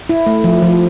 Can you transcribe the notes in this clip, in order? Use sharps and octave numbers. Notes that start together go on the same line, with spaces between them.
E4
A3
F3
F3